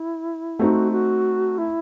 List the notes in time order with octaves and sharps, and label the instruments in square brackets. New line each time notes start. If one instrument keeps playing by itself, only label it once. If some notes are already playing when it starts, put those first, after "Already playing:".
Already playing: [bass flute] E4
[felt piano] A3 C4 D#4 [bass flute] F#4
[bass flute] F#4
E4